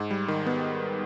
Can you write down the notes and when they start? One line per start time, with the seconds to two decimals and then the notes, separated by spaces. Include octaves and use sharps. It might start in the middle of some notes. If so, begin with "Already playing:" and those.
Already playing: G#2
0.11 G3
0.28 D#3
0.47 B3